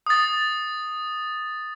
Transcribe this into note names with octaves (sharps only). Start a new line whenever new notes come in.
D#6 A6